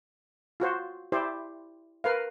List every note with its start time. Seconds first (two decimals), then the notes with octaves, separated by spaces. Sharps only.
0.60 F4 F#4 C5
1.12 E4 G4 C5 D5
2.04 A#4 B4 F5